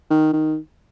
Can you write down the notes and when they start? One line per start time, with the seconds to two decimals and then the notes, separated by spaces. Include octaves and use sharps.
0.10 D#3
0.33 D#3